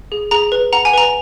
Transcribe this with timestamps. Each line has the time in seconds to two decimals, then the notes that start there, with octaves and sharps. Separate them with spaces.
0.12 G#4
0.31 G#4 A#5
0.52 B4
0.73 F#5 A#5
0.85 G#5
0.93 B4 A#5